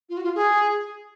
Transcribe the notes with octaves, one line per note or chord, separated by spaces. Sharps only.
F4
F#4
F4
G#4